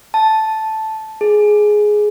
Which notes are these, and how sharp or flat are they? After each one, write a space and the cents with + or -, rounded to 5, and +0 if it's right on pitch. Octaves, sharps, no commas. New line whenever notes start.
A5 -5
G#4 +10